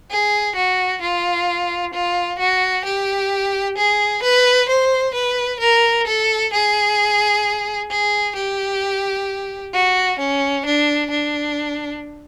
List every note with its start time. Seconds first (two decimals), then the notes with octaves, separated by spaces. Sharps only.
0.11 G#4
0.56 F#4
1.02 F4
1.94 F4
2.39 F#4
2.85 G4
3.77 G#4
4.23 B4
4.69 C5
5.14 B4
5.60 A#4
6.07 A4
6.53 G#4
7.90 G#4
8.36 G4
9.74 F#4
10.19 C#4
10.65 D4
11.10 D4